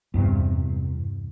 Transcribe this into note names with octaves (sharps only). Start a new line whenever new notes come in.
E2 G2 C3